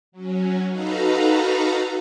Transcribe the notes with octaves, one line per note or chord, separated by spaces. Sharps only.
F#3 C#4
D#4 F#4 A4 B4 F5 A#5